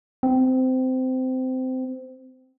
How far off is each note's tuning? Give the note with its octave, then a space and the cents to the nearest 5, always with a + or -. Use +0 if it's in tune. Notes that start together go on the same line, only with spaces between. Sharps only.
C4 -20